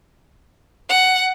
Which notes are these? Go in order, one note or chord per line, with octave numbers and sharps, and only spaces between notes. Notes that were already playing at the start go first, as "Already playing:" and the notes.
F#5